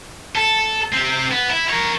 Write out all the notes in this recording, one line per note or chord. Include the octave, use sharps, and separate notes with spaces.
A4
C4 G4
B3
E4
A#4 C#5